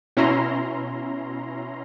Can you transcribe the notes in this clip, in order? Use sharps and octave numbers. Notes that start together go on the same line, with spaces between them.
B2 C#4 E4 A#5 C6